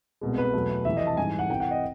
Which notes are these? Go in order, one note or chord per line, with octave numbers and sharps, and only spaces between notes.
C2 B2 G#3
B4
E2 B2 F#3 A3
F2 C3 E3 E5
D#5
A5
G#2 E3 G3 G#5
F#5
C2 C3 E3 G5
F#5
D#5